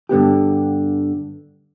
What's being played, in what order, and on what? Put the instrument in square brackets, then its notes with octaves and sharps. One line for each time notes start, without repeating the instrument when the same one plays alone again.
[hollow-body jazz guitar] G2 D3 B3 G4